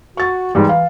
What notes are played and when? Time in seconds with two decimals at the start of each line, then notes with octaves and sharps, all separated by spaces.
0.17 F#4 C#6 A6
0.55 G#2 E3 G3
0.69 F5